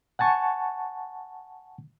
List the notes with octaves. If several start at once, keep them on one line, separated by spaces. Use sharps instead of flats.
F#5 G#5 A5 C#6